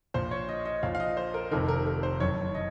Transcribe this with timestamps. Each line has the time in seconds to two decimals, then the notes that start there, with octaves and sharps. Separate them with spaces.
0.14 A#1 A#2 C5
0.31 C#5
0.49 D#5
0.65 D#5
0.83 A#1 A#2 F5
0.95 F5
1.00 D#5
1.17 C5
1.34 A#4
1.51 F1 F2 C3 D#3 A#4
1.68 A#4
1.87 A#4
2.03 C5
2.20 F#1 F#2 D#3 C#5
2.55 D#5